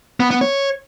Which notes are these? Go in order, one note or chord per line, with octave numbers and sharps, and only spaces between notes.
B3
B3
C#5